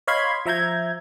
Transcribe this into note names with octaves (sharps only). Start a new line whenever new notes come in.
C#5 D#5 F5 B5 C6 G#6
F3 E5 A#5 G6 G#6